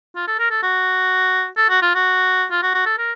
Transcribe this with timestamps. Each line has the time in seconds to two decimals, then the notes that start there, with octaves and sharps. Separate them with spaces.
0.16 F4
0.28 A4
0.39 A#4
0.51 A4
0.63 F#4
1.57 A4
1.69 F#4
1.82 F4
1.95 F#4
2.51 F4
2.63 F#4
2.75 F#4
2.86 A4
2.98 A#4